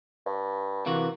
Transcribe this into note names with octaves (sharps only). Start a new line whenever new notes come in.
G2
C3 E3 A#3 F#4